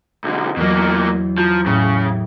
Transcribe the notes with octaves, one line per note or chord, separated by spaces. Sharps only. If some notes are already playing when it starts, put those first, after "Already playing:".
B1 D3 D#5 A#5
E2 B2 F#3 A#3
F3 A#5 D6 E6
A2 C#3